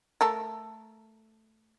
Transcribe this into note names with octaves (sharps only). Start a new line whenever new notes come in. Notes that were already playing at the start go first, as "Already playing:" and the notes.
A3 A4 A#4